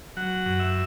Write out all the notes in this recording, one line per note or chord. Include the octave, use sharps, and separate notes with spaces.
F#3 F#5
F#2
E5